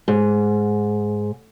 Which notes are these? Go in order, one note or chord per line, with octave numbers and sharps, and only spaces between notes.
G#2